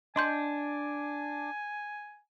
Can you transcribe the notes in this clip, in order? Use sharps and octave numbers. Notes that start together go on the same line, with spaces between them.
D4 D#5 G#5 C6 G6